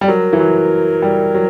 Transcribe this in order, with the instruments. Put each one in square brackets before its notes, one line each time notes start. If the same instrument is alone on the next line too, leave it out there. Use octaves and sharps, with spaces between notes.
[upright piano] G3
[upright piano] F#3 [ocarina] A#4
[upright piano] E3
F#3
G3
F#3